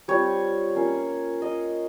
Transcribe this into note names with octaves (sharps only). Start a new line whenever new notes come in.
G3 C4 F4 C#5
A#3 C#4 F4
A#3 F4 D#5